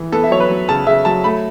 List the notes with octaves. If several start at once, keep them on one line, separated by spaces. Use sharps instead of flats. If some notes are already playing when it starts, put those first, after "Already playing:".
Already playing: E3
B3 A4
E5
F#3 C#5
B4
F#3
C#3 A5
C#3 E5
F#3 A5
A3 B5